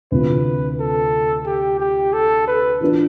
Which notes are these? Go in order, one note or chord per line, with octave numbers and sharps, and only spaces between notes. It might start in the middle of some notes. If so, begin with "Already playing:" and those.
D2 C3 E3 B3 F4 B4
A4
G4
G4
A4
B4
E3 B3 D4 F4 B4